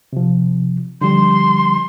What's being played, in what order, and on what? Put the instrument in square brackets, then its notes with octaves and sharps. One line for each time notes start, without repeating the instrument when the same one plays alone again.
[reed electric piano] C3 F3
[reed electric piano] D3 F3 G3 [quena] C6